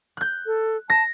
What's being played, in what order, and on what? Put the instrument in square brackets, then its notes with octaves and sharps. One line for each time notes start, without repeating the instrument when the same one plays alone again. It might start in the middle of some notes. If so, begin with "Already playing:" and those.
[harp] F#6 G6
[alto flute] A4
[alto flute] A5 [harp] A#6